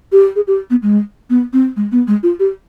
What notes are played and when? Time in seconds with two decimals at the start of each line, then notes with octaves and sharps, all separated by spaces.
0.12 G4
0.36 G#4
0.47 G4
0.70 B3
0.83 G#3
1.30 B3
1.53 C4
1.76 G#3
1.92 B3
2.07 G#3
2.23 F4
2.39 G4